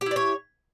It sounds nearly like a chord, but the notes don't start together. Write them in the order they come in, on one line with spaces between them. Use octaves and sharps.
G4 E4 D5 C#5